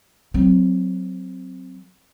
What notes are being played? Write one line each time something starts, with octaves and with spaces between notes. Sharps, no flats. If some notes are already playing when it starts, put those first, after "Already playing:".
F#3 C4